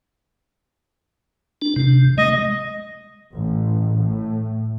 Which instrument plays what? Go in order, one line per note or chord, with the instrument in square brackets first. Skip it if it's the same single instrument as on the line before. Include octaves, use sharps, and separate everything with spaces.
[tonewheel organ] D4
C3
[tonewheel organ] G#3 [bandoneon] D#5
[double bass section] A1
A2